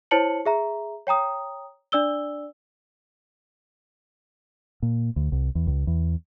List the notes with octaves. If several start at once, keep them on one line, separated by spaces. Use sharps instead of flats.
E4 C5 C#5 A5 C#7 F#7
G#4 E5 A#5
C#5 G5 A#5 D#6
D4 D5 E6 G7
A#2
D2
C2
E2
C#2
E2